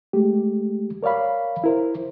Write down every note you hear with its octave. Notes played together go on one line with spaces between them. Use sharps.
G#3 A3 G4
A#4 C#5 D5 F5 B5
E4 A#4 C5